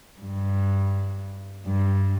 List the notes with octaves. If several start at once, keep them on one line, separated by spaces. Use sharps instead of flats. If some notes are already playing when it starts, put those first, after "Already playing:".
G2
G2